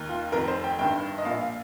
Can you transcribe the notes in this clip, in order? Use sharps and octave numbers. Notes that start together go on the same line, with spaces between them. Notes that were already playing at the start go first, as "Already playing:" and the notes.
Already playing: D#2 D#3
F4
F1 F2 D#3 A#4
C5
G5
G1 G2 D#3 G5
D#5
A#1 A#2 F5
F5